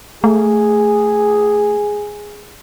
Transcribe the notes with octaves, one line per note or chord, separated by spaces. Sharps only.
A3 G#4